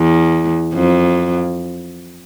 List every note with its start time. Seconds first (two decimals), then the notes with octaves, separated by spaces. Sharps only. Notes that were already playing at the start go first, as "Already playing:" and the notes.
Already playing: E2
0.74 F2